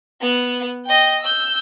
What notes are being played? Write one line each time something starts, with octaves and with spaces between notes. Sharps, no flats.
B3
D#5 G5
E6 G6